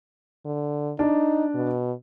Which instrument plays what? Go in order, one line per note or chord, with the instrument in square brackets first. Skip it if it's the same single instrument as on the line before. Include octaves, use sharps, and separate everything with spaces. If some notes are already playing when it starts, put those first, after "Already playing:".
[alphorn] D3
[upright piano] D4 [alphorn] D#4
[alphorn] B2